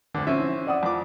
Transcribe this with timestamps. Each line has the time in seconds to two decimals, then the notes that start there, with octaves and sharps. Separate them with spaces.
0.14 D2 D3
0.27 F3 C4 C#4 E5
0.40 E3
0.67 D5 F#5 D#6
0.83 F2 E3 D6